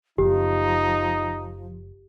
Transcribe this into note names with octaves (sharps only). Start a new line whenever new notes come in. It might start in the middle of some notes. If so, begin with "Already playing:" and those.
F#1 F3 D#4 G4